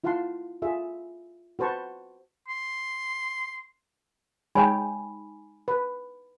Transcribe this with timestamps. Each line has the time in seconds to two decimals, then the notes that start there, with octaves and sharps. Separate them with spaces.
0.04 E4 F4 F5 F#5 A5 C6
0.62 F4 G#4 E5
1.59 F#4 B4 C5 A5 C#6
2.48 C6
4.55 G#3 D#4 C#5 G5 G#5 B5
5.68 B4